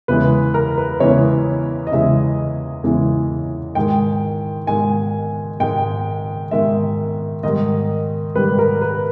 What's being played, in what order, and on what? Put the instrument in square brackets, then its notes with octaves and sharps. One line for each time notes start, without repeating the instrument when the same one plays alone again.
[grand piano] E2 C#3 E3 G#3 B4
A#4
B4
E2 C#3 E3 G#3 C#5
D#5
E2 C#3 E3 G#3 E5
E2 C#3 E3 G#3
G#2 D#3 G#3 G5
G#2 D#3 G#3 G#5
G#2 D#3 G#3 G5
G#2 D#3 G#3 E5
G#2 D#3 G3 D#5
G#2 D#3 G3 B4
A#4
B4